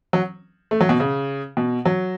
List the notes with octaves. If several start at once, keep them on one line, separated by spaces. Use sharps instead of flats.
F#3
A3
F#3
B2
C#3
B2
F#3